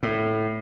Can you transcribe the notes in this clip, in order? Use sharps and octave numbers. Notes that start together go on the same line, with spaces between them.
A2